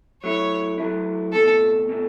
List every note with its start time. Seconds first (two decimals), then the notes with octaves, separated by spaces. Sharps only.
0.23 F#3 A3 E4 C#5
0.78 F#3 A3 E4
1.33 C#2 B2 A3 A4
1.89 B2 A3